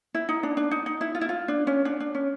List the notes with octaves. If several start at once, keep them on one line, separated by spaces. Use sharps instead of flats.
E4
D#4
D4
D4
D#4
D#4
E4
F4
E4
F4
D4
C#4
D4
D4
C#4